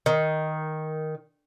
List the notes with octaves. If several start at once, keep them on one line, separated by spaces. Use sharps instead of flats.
D#3